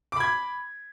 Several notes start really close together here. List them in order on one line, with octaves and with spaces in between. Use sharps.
D6 B5 G#6